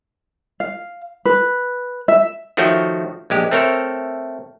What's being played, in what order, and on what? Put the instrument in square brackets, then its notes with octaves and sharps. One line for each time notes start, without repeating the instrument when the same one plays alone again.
[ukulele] F5
B4
E5
[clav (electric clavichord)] D#3 F3 A3 F#4 C#5 G5
A#1 G#3 G4
A3 C4 A4 A#4 C#5